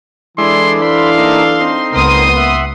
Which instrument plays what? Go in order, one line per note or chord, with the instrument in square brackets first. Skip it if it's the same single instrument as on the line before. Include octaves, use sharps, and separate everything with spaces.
[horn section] E3 D4 A4 [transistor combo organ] G#3 E4 D5 [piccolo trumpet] C6
[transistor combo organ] C5 B5 [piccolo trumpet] F5 [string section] C6
[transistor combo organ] A#3 D#4 E5
C4 D#4
[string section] C#2 C6 D#6 [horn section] A#3 B3 [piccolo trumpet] A#4
[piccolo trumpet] E5 [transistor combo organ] F#5